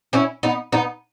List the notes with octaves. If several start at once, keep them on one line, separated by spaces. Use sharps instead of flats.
C#4 E4
B3 D#4
B3 D#4